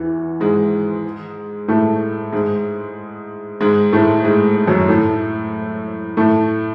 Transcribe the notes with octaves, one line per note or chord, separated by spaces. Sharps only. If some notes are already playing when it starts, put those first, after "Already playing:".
Already playing: E2 E3
G#2 G#3
A2 A3
G#2 G#3
G#2 G#3
A2 A3
G#2 G#3
F#2 F#3
A2 A3
A2 A3